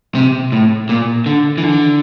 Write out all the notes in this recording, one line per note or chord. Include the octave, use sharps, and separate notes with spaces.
C3
A2
A#2
D3
E3
D3